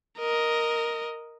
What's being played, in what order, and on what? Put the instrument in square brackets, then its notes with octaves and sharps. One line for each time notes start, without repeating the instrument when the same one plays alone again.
[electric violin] A#4 D#5